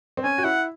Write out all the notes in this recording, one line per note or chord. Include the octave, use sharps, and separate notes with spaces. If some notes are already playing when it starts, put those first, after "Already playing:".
C4
C#4 G#5
F#4
E4 F#5